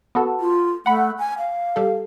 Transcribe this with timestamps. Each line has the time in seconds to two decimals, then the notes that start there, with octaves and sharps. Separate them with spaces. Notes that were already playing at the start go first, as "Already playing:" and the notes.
0.15 B3 F#4 A4
0.40 F4
0.86 A3 F#5 B5
1.19 G#5
1.38 F5
1.76 G3 A4